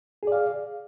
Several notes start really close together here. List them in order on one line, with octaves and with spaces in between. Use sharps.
G#4 D5 F5